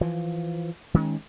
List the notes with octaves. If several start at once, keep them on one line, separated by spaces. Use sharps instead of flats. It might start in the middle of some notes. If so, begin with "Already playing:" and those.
E3 F3
D#3 G#3 C#4